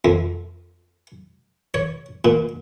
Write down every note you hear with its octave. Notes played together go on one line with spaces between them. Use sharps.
F2
C#5
A#2